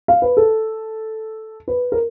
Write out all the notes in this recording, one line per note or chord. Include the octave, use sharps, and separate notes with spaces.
F5
B4
A4
B4
A#4